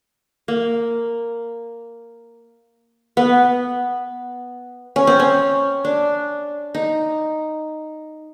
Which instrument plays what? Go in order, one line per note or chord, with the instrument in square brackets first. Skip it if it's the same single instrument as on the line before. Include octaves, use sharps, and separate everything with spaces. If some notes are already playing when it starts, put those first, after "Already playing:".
[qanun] A#3
B3
C#4
C4
C#4
D4
D#4